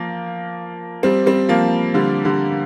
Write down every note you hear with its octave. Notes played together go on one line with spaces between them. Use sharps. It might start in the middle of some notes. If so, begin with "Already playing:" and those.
Already playing: F3 A#3
G3 C4
G3 C4
F3 A#3
D3 G3
D3 G3